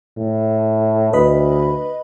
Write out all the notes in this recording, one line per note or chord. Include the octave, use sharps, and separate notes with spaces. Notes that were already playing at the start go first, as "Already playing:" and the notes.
A2
D2 B4 D#5 B5